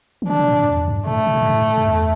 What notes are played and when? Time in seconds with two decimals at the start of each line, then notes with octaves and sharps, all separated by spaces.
0.22 E3
0.29 D3 D4
0.39 C3
0.48 A2
0.59 G2
0.68 E2
0.88 G2
1.07 A2 A3
1.27 C3
1.35 A2
1.42 G2
1.49 A2
1.78 G2
1.86 E2